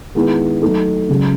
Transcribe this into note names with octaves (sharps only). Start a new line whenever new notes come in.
D#3 G#3 B3 E4 G#4
F#3 A3 D#4 A4
C#2 C#3 F#3